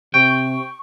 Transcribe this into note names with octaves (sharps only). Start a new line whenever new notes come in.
C3 G5 C#6